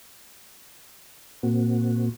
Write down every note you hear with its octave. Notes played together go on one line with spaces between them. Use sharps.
A#2 A#3 C4 F#4